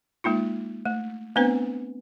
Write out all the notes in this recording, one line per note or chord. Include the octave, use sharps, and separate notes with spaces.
G#3 A#3 D#4 F4
A3
A3 B3 C4 D4 B4 C5